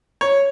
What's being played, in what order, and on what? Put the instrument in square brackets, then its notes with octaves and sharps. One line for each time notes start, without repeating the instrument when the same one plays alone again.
[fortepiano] C#5